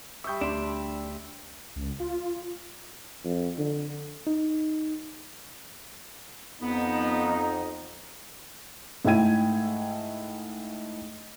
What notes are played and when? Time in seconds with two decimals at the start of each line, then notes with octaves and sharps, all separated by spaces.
0.24 G3 E5 C#6 D#6 G6
0.41 D2 D4 C6
1.76 C#2
2.00 F4
3.25 F2
3.58 D3
4.27 D#4
6.62 F2 B3 D#4
9.05 G#2 A3 E4 G5 G#6 D#7